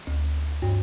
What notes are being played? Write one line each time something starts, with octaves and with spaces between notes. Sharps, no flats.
D2
G2